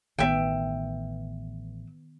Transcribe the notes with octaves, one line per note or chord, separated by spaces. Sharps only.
A1 D#3 B3 E5 G5